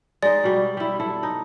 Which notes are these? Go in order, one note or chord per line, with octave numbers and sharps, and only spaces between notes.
G#3 D#4 D5
B2 G3
G3 E4
E4 A4
D#4